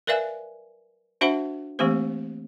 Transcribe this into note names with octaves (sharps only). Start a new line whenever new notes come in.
A#4 B4 D5 E5 F5 G#5
D4 F#4 C5 E5 F#5 B5
E3 A3 A#3 C4 G4 C5